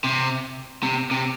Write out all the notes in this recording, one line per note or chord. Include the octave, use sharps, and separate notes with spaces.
C3
C3
C3